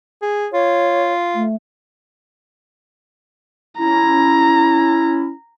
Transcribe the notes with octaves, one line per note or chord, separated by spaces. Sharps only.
G#4
F4 C#5
A3
C#4 E4 A#5